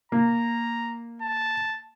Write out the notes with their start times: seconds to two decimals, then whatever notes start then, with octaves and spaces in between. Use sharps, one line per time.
0.12 A#3 A#5
1.22 A5